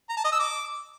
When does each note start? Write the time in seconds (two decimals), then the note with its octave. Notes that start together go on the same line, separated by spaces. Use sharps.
0.09 A#5
0.17 A5
0.24 D#5
0.32 E6
0.39 D6